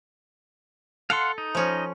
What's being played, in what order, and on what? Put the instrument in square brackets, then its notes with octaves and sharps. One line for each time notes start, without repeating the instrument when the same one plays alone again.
[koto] A4 [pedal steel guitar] F5 F#5 C6
[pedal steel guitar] D#4
[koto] F3 C#4